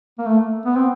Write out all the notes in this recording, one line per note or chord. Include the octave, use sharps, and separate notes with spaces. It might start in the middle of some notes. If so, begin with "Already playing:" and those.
A#3
A3
B3
C4